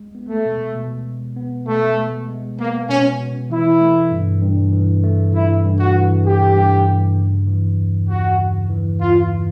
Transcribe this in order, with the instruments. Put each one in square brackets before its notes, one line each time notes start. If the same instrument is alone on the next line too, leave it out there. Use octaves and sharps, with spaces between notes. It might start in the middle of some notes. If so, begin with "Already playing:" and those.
Already playing: [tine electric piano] G#3
B3
[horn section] A3
[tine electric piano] B2
B2
G#3
B3
[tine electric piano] B2 [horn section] A3
[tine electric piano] B2
G#3
[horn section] A#3 [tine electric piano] B3
[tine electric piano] B2 [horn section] C#4
[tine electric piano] B2
[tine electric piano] E3 [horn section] E4
[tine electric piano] A3
G2
G2
E3
A3
[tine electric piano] G2 [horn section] E4
[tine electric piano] G2
[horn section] F#4
[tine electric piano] E3
[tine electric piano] A3 [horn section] G4
[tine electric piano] G2
G2
C#3
E3
E2
[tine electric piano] E2 [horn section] F#4
[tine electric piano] C#3
E3
[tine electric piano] E2 [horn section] F4